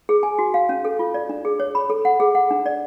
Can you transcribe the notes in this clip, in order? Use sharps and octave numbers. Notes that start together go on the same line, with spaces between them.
G#4
G#5
F#4
F5
C#4
A4
F4
D5
D4
G#4
C#5
B5
A4
F#5
G#4
F#5
D4
D5